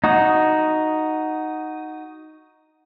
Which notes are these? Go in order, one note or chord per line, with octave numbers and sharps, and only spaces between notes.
D#4 F#4 D#6